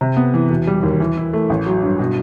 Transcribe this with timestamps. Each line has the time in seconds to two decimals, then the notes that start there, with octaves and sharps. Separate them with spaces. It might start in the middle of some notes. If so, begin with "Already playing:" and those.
0.01 C3
0.17 B3
0.34 E3
0.50 E1
0.67 G3
0.83 D#2
1.00 E3
1.17 E4
1.33 A3
1.50 A1
1.66 F#3
1.83 G2
1.99 B2